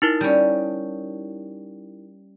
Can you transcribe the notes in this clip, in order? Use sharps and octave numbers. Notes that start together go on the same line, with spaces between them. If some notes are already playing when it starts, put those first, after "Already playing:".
D#4 E4 A#4
G3 C#4